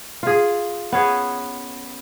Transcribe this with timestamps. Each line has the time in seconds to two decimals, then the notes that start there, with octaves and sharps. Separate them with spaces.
0.23 F4 G#4
0.92 B3 C#4 G#4